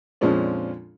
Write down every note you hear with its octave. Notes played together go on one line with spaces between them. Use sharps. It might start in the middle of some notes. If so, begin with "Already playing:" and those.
F2 A#2 F3 G#3 C#4 D4